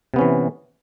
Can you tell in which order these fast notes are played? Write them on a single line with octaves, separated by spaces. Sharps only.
C3 B3 C#4 E3